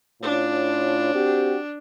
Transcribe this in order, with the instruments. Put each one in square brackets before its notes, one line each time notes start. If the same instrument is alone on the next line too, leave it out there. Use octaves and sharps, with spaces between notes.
[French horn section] A2 C#4 F4 [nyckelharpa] D4
[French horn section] C4 F#4 G4